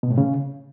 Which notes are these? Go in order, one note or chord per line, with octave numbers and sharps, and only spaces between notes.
B2
A2
C#3